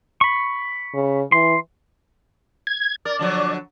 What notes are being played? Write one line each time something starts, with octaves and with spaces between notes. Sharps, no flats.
B5 C#6
C#3
E3 C6
G#6
A#4 D5
D3 F3 F#3